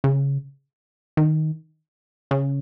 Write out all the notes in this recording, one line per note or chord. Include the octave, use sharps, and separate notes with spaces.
C#3
D#3
C#3